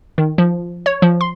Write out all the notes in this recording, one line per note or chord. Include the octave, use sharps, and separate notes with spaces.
D#3
F3
C#5
F3
C6